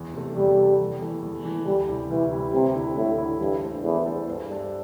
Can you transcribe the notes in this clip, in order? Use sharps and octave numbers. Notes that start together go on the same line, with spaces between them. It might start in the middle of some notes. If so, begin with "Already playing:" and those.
Already playing: E2
C3 A3
E2 G3
C3 A3
E2
E3 A3
E2
E3 A3
D2 G3
C3 G3 E4 G4
D2 E3
C3 G3 E4 G4
D2 C3
D3 A3 E4
D2 A2
D3 A3 E4
G2 E3
A3 D4 A4 C5
E2 E3
A3 D4 A4 C5
G2
G3 D4 A4 C5